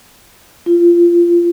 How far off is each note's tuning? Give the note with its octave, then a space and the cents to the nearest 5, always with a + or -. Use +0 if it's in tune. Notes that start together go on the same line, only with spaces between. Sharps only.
F4 -20